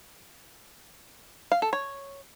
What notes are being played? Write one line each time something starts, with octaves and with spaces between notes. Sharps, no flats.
F5
A4
C#5